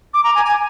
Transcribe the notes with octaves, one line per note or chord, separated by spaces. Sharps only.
D6
A#5
G#5
G#5